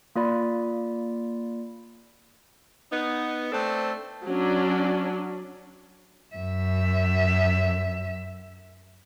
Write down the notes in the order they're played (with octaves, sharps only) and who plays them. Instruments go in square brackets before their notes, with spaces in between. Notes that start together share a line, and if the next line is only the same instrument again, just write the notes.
[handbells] A#3 F4 D5 B5
[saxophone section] B3 D#4
A3 C4 D4 A4
[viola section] F#3 C#4 D4
[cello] F#2 E5